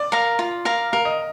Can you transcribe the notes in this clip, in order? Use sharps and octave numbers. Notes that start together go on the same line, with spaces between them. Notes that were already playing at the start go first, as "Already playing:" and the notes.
Already playing: D5
A#4 F5 A#5
F4
A#4 F5 A#5
A#4 F5
D#5